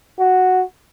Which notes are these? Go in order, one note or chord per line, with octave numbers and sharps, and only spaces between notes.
F#4